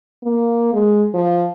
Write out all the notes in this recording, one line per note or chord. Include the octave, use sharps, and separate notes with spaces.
A#3
G#3
F3